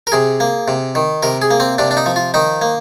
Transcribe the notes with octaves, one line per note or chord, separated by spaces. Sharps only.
A#4
C3 G#4
A#3
C3
D#3
C3 A#4
G#4
A#3
C4
C3 D4
D4
D#4
F3
F4
D#3 D#4
A#3